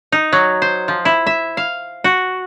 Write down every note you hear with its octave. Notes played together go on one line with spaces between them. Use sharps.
D#4
F#3
C5
F3
E4
E5
F5
F#4